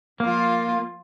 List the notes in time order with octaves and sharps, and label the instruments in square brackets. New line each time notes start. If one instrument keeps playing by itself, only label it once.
[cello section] F3 F4 [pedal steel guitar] A#3